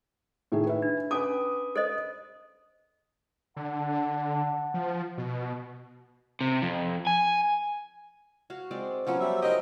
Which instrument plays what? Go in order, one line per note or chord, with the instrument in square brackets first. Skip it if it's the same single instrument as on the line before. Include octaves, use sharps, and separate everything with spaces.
[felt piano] A2 D#3 G#4
B4 E5
[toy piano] D4
[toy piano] C#4 G#5 D6 [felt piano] B4 D#6
[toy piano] A4 C5 D#5
[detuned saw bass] D3 [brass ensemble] F#5 A5
[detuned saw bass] F3
B2
[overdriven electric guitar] C3
F2
G#5
[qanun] F#4 F5
G#3 C4 D5
[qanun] F3 F#3 B3 [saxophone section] C#4 F4
[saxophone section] G3 E5
[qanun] D#4 A#4 [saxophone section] G4 C5 D#5